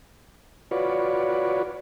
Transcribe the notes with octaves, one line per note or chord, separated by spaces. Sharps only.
F4 F#4 B4 C#5 D5